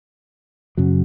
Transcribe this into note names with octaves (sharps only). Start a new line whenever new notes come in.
F#2 C#3 F#3